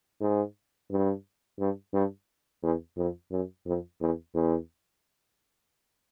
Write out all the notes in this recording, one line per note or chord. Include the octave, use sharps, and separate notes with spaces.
G#2
G2
G2
G2
E2
F2
F#2
F2
E2
E2